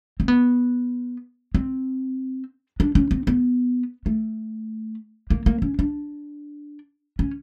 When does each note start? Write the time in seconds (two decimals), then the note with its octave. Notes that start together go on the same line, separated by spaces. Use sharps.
0.20 C4
0.28 B3
1.55 C4
2.80 D4
2.95 C#4
3.11 C4
3.27 B3
4.06 A3
5.30 A#3
5.46 A#3
5.62 C#4
5.79 D4
7.19 C#4